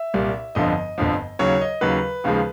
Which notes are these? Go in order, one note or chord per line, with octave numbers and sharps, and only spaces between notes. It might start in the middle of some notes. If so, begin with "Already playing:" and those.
Already playing: E5
C2 A#2 G3
G1 F2 D3 F3 D#5
G1 F2 D3 F3
D#2 C#3 F#3 C#5
D#5
D#2 C#3 F#3 B4
D#2 C#3 F3 G#3